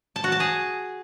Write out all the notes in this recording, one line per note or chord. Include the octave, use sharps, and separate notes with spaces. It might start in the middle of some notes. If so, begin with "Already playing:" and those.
A5
F#4
A5
G#4